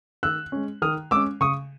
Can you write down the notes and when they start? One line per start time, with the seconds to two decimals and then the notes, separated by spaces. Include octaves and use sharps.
0.23 D#3 E6 F#6
0.52 G#3 C#4
0.82 D#3 D#6 F6
1.11 G#3 D6 E6
1.16 C#4
1.41 C#3 C#6 D#6